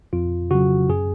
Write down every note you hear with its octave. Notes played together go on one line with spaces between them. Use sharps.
F2 F4
C#3 F#3 F#4
F#2 G#4